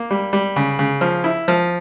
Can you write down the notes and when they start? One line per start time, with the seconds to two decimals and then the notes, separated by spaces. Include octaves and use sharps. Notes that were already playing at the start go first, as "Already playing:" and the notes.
Already playing: A#3
0.11 G3
0.33 G3
0.56 C#3
0.79 C#3
1.01 F3
1.24 E4
1.48 F3